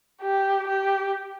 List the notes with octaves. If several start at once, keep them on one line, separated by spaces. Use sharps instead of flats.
G4
G4